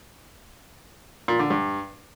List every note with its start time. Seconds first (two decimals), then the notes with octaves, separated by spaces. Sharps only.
1.28 A#2
1.39 D3
1.50 G2